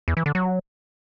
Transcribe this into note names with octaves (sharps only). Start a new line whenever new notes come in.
E2
E3
D3
F#3